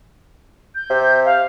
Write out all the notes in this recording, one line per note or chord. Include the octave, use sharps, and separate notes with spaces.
G6
C3
F5